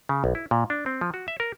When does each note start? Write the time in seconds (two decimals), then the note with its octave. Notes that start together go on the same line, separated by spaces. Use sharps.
0.09 C#3
0.24 B1
0.35 E4
0.51 A#2
0.70 D4
0.86 C4
1.01 F3
1.14 F#4
1.28 E5
1.40 A#4